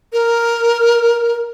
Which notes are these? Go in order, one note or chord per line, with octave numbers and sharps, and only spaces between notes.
A#4